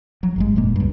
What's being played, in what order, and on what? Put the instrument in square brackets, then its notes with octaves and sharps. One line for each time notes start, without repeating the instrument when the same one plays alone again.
[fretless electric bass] F3 F#3
G#1 G2 G#3
F1 A#2 G#3 A#3
C#2 G2